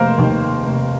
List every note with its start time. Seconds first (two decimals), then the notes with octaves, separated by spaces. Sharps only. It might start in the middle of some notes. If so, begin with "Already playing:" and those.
Already playing: F1 A#3 A#4 C5
0.18 D#2 D#3
0.64 F1